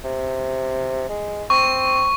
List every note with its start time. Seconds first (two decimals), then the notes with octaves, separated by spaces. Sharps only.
0.04 C3
1.09 G#3
1.50 C4 C#6